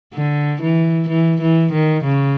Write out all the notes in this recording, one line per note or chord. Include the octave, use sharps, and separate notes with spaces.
D3
E3
E3
E3
D#3
C#3